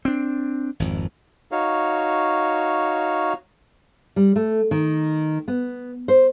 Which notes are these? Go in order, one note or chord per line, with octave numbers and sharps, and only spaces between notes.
C4 D4
G#1 F2
D#4 F#4 C#5 F5
G3
A3
D#3
B3
C5